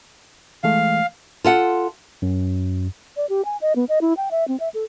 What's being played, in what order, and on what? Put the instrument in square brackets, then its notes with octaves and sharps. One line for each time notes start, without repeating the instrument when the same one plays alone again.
[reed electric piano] E3 G#3 A3 [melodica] F5
[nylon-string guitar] F4 A4 F#5
[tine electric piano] F#2
[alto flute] D5
G4
G#5
D#5
B3
D#5
E4
G5
E5
C4
E5
A4